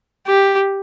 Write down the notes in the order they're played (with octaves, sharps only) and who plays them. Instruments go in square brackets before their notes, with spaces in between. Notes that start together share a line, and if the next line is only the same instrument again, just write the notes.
[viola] G4